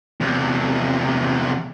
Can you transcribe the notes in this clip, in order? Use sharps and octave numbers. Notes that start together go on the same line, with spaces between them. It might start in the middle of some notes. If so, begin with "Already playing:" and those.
E2 C3